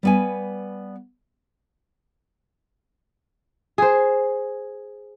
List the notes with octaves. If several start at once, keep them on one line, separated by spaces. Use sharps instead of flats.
G3 B3 G#5
G#4 C5